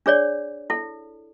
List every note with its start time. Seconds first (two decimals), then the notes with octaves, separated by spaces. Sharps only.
0.06 D4 G#4 C#5 D5
0.70 E4 A4